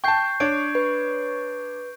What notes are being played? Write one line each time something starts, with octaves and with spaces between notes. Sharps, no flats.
G5 A5 C#6 G6 C7
D4 C#5 D7
B4